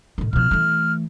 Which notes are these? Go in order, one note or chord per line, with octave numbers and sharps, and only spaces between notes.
A2 D#3
B2 F3 F6
E3 A3